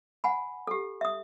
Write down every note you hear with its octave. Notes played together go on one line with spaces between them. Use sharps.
F#5 G#5 B5
G4 A4
E5 D#6